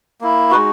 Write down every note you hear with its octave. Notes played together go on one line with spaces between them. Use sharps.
A#3 E4
G#3 D#4 F#4 B4